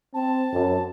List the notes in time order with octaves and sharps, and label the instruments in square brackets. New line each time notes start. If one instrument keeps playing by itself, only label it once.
[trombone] C4 [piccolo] A5
[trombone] F#2